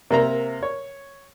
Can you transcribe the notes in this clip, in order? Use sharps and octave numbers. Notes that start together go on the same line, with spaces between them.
C3 A#3 E5 A#5
C#5